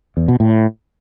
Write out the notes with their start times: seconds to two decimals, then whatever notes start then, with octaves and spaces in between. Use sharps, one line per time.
0.17 E2
0.28 B2
0.40 A2